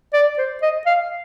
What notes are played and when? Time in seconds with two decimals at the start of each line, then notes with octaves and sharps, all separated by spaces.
0.14 D5
0.38 C5
0.62 D#5
0.86 F5